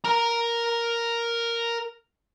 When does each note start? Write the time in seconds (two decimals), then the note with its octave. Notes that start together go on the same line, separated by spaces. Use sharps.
0.04 A#4 A#5